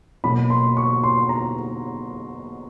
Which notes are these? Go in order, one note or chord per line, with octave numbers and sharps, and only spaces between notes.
B2 F#3 A#3 B5
C6
C#6
C6
A#5